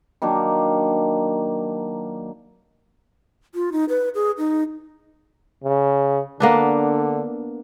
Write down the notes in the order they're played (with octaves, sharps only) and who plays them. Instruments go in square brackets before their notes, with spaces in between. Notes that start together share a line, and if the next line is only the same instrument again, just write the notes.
[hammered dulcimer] D#3 F#3 A#3 D4
[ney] F4
D#4
B4
G#4
D#4
[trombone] C#3
[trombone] D3 [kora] A#3 B3 D4